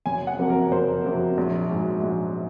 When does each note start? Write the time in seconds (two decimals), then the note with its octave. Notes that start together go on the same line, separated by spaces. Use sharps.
0.06 F#1 G#5
0.27 F#5
0.38 F2 C3 F#3 A#3
0.49 A#4
0.71 F#1 C5
1.04 F2 C3 F#3 A#3
1.37 A#1
1.69 G#2 F#3
2.03 A#1